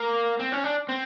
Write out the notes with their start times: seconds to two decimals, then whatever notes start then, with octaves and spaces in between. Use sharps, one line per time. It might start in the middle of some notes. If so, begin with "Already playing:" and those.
Already playing: A#3
0.39 C4
0.52 C#4
0.64 D4
0.89 C4